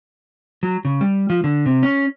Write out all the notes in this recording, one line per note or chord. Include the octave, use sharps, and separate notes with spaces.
F#3
C#3
G3
F3
D3
C3
C#4